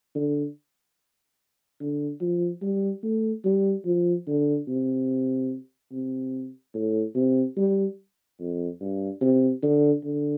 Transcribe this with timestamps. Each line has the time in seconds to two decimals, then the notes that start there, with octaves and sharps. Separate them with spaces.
0.15 D3
1.80 D3
2.21 F3
2.62 G3
3.03 A3
3.45 G3
3.86 F3
4.28 D3
4.68 C3
5.92 C3
6.74 A2
7.15 C3
7.57 G3
8.39 F2
8.80 G2
9.21 C3
9.63 D3
10.04 D3